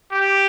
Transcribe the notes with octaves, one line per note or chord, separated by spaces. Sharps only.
G4